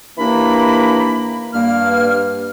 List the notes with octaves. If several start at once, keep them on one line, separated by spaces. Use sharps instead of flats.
D#2 E3 A#3 D4 A#5 B5
G2 A#3 F6